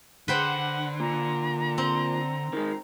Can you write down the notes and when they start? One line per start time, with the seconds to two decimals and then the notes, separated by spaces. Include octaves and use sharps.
0.28 D3 B4 C5 F#5 G5
1.00 A#2 A#5
1.78 C4
2.53 D#3 G#3